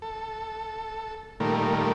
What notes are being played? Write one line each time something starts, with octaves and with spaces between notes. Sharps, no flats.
A4
A#2 D#3 G3 A3 A#4